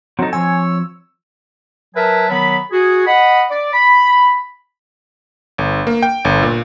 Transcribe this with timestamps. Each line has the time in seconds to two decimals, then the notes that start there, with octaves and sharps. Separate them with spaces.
0.19 F#3 C4 D#4 A4
0.33 F3 C4 F4 C#5 G#5 E6
1.95 F#3 A#4 B4 E5 G#5 A5
2.29 D#3 F#3 B3 B5
2.72 F#4 G#4
3.07 D#5 F#5 B5
3.50 D5
3.74 B5
5.58 G1
5.87 A#3
6.03 G5
6.25 G1
6.43 A#2